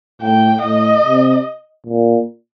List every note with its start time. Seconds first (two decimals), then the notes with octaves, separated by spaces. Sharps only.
0.21 A2 G5
0.63 A2 D#5
1.04 C3
1.86 A#2